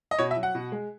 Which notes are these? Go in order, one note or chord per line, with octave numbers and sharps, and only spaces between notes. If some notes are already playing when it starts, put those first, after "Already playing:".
D#5
B2 C#5
E5
F#3
F#5
B2
G#3